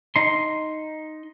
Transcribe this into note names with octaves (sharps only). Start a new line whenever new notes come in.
D#4 C6